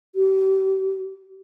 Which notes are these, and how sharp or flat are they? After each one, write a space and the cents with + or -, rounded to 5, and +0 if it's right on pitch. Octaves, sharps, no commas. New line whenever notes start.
G4 -35